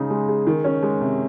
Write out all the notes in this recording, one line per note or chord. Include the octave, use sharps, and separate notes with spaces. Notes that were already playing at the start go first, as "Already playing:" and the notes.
Already playing: C#3 G#3 D#4 G#4
G#3
G#4
D#3
C#4
G#3
C3